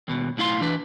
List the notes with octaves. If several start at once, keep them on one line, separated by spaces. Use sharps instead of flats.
D#2 B2
B1 A2 E4 F5 C6
E3 D4 B4